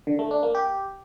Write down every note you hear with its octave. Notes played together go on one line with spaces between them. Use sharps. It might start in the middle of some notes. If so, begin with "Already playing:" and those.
D3
A3
D4
A#3
G4